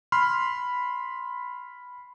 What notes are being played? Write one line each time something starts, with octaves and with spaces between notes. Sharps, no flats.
B5 C6 F6